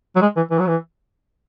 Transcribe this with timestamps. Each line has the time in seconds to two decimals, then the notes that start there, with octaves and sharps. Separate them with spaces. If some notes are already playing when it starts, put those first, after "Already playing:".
0.16 F#3
0.22 G#3
0.37 E3
0.51 E3
0.59 F#3
0.67 E3